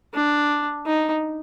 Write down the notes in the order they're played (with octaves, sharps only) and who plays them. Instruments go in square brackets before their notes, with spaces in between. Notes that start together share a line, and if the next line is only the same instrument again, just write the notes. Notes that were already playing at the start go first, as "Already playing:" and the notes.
[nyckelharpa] D4
D#4